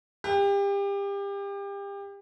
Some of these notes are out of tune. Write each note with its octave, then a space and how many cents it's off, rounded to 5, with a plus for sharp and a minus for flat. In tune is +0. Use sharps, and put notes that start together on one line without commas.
G4 +30